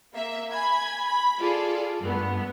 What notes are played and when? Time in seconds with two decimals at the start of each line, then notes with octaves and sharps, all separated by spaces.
0.13 A#3 E5
0.50 G#5 B5 G#6
1.07 B5
1.39 F4 G#4 A4 D5
1.99 G2 A3 B3